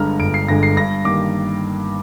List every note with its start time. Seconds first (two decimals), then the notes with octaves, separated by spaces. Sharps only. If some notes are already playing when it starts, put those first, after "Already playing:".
Already playing: G1 G2 D3 G#3 A#5 F6
0.20 G1 D7
0.34 C7
0.48 G2 D3 G#3 A#6
0.63 C7
0.76 G2 A#6
1.05 D#3 G3 A#3 D6